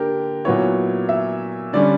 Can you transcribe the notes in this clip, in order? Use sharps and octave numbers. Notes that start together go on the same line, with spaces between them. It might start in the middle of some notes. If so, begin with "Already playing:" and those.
Already playing: D3 A#3 D4 G4 A#4
A#2 F#3 B3 E4 C#5
E5
D3 G3 C#4 D5